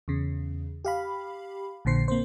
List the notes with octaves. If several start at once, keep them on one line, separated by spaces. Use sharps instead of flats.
E2 C#3
G4 F5 B5
A#1 A#2 D3 C5 C7
A#3 C4 C5